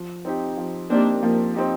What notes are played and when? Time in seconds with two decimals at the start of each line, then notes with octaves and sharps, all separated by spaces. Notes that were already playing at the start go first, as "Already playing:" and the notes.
Already playing: F3
0.25 C4 D#4 G4
0.57 F3
0.90 A#3 C4 D4 D#4 G4
1.22 F3 A#3
1.54 C4 D#4 G4